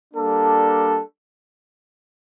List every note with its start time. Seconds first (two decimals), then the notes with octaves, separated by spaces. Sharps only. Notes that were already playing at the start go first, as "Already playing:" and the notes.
0.14 G3 A#3 D4 A4